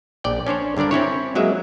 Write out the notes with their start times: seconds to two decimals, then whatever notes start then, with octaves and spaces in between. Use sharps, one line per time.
0.24 A#1 D5 G5
0.47 C#4 D4 C5 C#5
0.77 G2 D3 D4 A#4 D5
0.91 C4 C#4 E4 C#5
1.35 F#3 G#3 A#3 E5